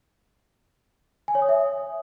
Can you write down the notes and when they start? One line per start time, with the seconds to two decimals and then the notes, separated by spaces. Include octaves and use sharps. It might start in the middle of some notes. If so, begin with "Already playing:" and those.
1.28 G#5
1.35 C#5
1.42 D#6
1.49 E5